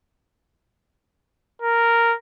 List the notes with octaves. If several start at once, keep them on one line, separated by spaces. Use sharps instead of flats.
A#4